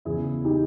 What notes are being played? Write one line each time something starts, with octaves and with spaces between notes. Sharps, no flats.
E2 C#3 E3 E4 G#4
D#4 G4